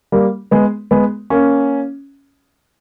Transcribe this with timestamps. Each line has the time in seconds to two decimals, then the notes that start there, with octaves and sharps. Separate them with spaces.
0.12 G3 A#3
0.51 G#3 B3
0.91 G#3 B3
1.30 A#3 C#4